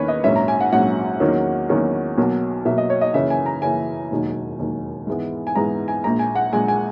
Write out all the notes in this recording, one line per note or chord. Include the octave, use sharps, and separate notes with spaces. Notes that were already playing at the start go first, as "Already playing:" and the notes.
Already playing: E2 D#3 A#3 C#4 B4 C#5
D#5
A#1 G#2 F#3 C#4 E5
A#5
G#5
F#5
A#1 G#2 F#3 C#4 F#5
E2 D#3 F#3 A#3 C#4
E2 D#3 F#3 A#3 C#4
B1 B2 F#3 A#3
B1 B2 F#3 A#3 E5
D#5
C#5
D#5
F#2 C#3 E3 A#3 C#4 E5
G#5
A#5
F#2 C#3 E3 A#3 C#4 G#5
E1 D#2 D#3 F#3
E1 D#2 D#3 F#3
G#2 E3 G#3 B3
G#5
G#2 E3 G#3 B3 A#5
G#5
A#1 A#2 G#3 A#5
G#5
F#5
A#1 A#2 G#3 G#5
G#5